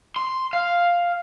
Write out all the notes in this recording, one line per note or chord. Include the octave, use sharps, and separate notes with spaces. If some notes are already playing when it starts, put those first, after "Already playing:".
C6
F5